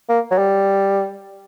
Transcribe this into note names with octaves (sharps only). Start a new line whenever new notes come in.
A#3
F#3
G3